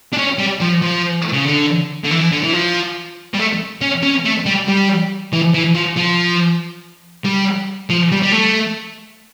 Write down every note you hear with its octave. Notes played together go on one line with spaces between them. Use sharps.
D4
C#4
G3
F3
F3
C#3
D3
D3
E3
D3
E3
F3
G3
A3
C#4
C#4
A3
G3
G3
E3
E3
F3
F3
G3
F3
G3
G3
A3